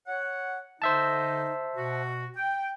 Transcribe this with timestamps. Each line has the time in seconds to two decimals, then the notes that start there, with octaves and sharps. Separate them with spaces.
0.07 C#5 F#5
0.82 D3 D#4 C5 E5 A5
1.77 B2 F#4
2.37 G5